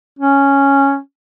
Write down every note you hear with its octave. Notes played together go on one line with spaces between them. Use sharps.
C#4